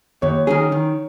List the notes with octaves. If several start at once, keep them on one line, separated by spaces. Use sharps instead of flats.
D#2 C#5
D#3 F#3 C#4 G#4
D#3